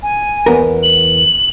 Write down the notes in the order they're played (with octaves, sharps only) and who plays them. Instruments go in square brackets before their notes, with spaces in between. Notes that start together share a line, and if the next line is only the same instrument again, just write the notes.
[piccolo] G#5
[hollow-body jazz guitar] E2 B3 A#4
[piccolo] F#7